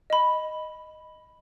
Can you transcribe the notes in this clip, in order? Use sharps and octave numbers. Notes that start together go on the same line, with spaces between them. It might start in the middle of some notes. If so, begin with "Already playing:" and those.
D#5 B5